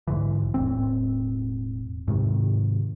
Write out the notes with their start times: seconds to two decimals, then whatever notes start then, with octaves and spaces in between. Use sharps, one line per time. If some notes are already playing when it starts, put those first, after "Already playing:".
0.07 B1 G#2 D3 E3
0.54 E1 A2 C4
2.08 G#2 C3 D#3